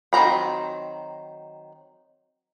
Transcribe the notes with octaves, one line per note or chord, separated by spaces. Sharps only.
D#3 F#3 C4 A#5 B5